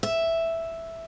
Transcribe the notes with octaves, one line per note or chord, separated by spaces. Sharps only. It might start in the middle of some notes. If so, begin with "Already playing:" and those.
E5